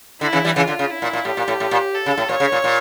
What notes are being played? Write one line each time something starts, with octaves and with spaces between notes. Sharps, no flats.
D3 E4
C#3 E3
E3 G3
C#3 E3 F4
D3
C#3
E4
A#2
A#2
A2 G4
A#2
A2
A2
A#2
A4
C#3
A2
A#2 C#5
C#3
A#2
A#2